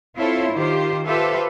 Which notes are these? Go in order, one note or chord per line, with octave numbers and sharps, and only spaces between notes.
C4 E4 F4 A4 C5 C#5
D#3 F4 G4 C5
F4 G4 A4 B4 C5 E5